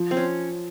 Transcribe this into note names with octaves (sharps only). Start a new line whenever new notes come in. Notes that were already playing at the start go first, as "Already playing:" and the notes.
Already playing: F3
C4
C#4